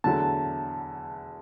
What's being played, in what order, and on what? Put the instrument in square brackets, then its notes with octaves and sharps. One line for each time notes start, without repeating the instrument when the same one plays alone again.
[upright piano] E2 D3 F#3 A3 E4 [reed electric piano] A5